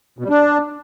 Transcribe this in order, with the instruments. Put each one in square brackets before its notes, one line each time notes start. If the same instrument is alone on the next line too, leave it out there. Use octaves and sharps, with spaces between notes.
[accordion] B2
G3
D4